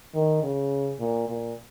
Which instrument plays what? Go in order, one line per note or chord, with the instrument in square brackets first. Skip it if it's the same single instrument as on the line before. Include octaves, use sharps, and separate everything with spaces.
[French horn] D#3
C#3
A#2
A#2